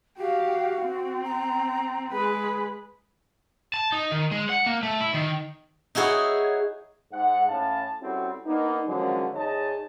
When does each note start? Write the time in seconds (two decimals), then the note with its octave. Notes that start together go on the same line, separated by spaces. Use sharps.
0.18 F#4 G4 F5
0.81 C4
1.24 A#5
2.12 G#3 G#4 B4
3.74 A5
3.92 D#4
4.12 D#3
4.31 G#3
4.50 F#5
4.66 A#3
4.83 A3
5.01 E4
5.14 D#3
5.95 D#4 E4 F#4 G#4 C#5
7.12 G#2 F#5
7.48 A2 C#4 F5 A5
8.02 G3 C4 C#4 E4 F#4 A4
8.46 A#3 B3 D4 D#4
8.87 D3 D#3 F3 F#3 G#3 C#4
9.35 E2 D#4 G#4 C#5 D#5 A5